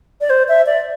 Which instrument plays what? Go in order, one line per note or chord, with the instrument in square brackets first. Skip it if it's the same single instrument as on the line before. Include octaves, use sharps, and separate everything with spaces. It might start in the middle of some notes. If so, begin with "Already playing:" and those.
[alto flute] D5
C5
E5
D5